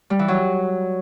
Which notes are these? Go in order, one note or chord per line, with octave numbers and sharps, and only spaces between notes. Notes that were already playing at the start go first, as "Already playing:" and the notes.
G3
E3
F#3